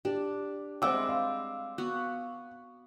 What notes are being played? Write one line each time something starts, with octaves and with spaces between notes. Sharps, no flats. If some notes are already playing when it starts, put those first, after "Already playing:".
D4 G4
G3 G#3 C4 C5 E5 F#5 D6 E6
F5
B3 F#4